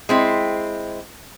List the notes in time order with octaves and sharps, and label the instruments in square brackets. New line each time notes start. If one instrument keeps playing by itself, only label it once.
[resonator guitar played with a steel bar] G#3 C4 E4